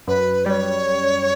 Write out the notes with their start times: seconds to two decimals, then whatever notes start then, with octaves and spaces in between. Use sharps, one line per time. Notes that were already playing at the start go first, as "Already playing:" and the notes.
0.07 F#2 B4
0.45 G3 C#5 D5